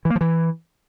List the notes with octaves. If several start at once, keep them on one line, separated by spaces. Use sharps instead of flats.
E3
A#3
F3
E3